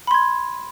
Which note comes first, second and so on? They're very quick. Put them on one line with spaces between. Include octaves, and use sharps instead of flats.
B5 C6 G#6